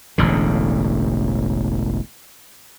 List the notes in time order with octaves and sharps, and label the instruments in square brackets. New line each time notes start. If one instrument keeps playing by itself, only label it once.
[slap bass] E1 A1 D3